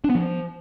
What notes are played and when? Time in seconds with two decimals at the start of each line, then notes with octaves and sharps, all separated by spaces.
0.04 D4
0.10 B3
0.15 F3